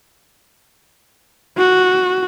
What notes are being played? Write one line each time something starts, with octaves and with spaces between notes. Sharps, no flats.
F#4